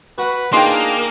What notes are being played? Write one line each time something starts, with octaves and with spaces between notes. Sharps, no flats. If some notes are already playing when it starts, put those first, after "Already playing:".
F#4 B4
A#3 D4 D#4 F4 G#4 G5 C6